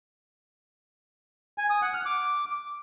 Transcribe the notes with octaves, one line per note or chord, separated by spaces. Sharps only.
G#5
D#6
F#5
F6
D6